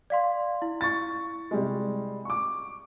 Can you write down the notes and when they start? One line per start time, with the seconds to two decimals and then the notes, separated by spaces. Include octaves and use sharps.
0.10 D5 F5 C6
0.62 E4
0.81 C#6 A6
1.51 C3 G3 G#3
2.25 C#6 D6